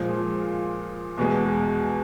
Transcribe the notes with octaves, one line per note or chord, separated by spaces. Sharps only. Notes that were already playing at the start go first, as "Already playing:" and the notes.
Already playing: A#2 F3 G#3
E2 B2 G#3